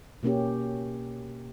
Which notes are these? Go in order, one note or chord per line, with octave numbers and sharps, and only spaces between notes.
B2 A#3 C#4 G4